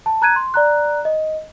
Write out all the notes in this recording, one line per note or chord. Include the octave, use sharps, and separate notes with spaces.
A5
A#5 F#6 G#6 D#7
C6
D5 A#5 F#6
D#5